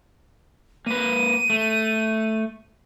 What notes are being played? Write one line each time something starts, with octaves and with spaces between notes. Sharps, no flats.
A#3 B4 D#7
A3